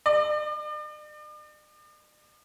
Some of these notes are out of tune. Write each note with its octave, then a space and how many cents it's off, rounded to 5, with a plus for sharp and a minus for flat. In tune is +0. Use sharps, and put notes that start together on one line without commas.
D5 +45